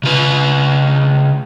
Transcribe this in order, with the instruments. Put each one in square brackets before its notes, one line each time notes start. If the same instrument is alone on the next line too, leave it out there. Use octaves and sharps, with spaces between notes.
[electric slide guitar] C#3 F4 B4